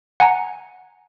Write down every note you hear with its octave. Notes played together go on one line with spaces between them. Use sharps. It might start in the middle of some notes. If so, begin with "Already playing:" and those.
F#5 G#5 A#5